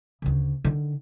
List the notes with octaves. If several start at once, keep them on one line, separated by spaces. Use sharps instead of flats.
D2 C#3
D3 D#3